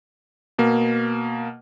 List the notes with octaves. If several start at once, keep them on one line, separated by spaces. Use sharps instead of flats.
B2 A#3